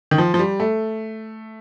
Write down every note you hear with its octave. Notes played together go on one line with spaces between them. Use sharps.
D#3
F3
F3
G3
A3